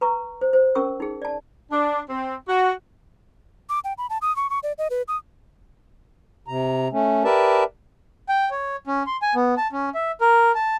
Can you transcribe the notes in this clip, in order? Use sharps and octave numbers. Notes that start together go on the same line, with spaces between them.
B4 A#5 C#6
C5
C5
C#4 A#4 C#6 E6
D#4 G#4
D5 A5
D4
C4
F#4
D6
G5
B5
A5
D#6
C#6
C#6
D5
D#5
B4
D#6
C3 A#5
A3 C#4
G4 A#4 B4 D5 E5 A5
G5
C#5
C#4
C6
G#5
B3
A5
C#4
E5
A#4
A5